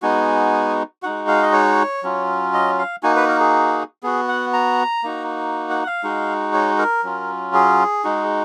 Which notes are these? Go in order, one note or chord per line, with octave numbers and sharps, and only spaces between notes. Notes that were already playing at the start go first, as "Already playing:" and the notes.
G#3 B3 D#4 F#4 G#5
G#3 D#4 F#4 F#5
F5
D#5
C#5
F#3 C#4 F4
D#5
F5
A#3 D#4 F#4 G#5
B4
A#4
G#4
B3 F#4 G#4
F#5
A#5
A#3 D#4 F#4
F#5
F#5
F5
G#3 D#4 F#4
C#5
A#4
F#3 C#4 F4
G#4
G#3 D#4 F#4